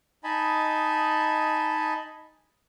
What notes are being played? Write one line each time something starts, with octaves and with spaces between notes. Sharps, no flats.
D#4 D#5 G#5 A5 B5